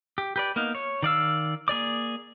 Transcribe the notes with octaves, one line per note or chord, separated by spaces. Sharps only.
G4
G4 B4 D5
A#3 B3 D#4 F5
C#5
D#3 D5 F5 E6
A#3 G#4 D5 D6